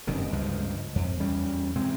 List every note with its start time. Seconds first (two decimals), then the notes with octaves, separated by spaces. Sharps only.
0.07 F1 F#2 C3 D#3
0.33 C#2 G2 F3 G#3
0.96 F2
1.20 E2 G3 C#4
1.76 C3 G#3 C4